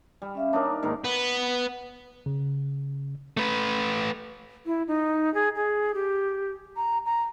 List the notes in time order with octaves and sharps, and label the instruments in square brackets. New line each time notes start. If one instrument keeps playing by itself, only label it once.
[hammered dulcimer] G3
[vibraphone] C#4 E5 F5
[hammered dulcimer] D4 D#4 A#4 [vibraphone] C#5 D6 D#6
[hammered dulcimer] G#2 D#3 A#4 [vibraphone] A#3
[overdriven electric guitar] B3
[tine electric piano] C#3
[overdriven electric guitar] A3 B4
[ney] E4
D#4
G#4
G#4
G4
A#5
A#5